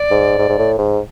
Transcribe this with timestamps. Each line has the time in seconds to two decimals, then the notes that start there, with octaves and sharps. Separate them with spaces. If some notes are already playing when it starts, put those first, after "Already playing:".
Already playing: D5
0.11 G#2
0.38 G#2
0.49 G#2
0.58 A2
0.78 G#2